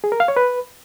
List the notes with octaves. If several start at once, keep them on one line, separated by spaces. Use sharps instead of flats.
G#4
A#4
F5
C#5
B4